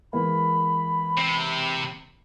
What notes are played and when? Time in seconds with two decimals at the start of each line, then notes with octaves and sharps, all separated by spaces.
0.13 E3 G#3 A#3 B5
1.17 C3